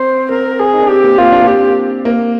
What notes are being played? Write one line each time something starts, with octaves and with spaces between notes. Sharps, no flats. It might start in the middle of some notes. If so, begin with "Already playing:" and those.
Already playing: C4 C5
C4 A#4
G#4
D#4
D4
C4 G4
A#3
A#3 F4
D4
A#3
C4 G4
A#3